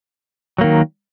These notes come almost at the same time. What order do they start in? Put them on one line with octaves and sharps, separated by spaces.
F#3 A#3 D#3